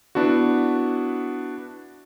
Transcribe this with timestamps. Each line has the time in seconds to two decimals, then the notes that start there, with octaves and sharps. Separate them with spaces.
0.15 B3 D4 E4 F#4